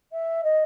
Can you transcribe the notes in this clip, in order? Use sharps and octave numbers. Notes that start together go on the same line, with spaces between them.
E5
D#5